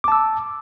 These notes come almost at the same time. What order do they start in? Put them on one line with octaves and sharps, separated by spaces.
D6 A5 E6